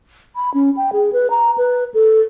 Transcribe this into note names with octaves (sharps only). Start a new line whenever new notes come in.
B5
C#4
G5
G#4
B4
A#5
B4
A4